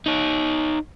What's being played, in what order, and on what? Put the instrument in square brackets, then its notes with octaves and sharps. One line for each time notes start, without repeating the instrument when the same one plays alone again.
[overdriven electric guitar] D#4 C#5